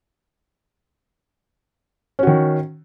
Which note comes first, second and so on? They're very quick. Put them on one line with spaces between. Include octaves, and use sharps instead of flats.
C#4 F#4 D#3